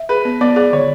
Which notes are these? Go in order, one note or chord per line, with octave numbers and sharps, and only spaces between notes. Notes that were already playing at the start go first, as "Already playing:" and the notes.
Already playing: E5
G#4 B4
B3
B3 D5
G#4 D5
D3 C#5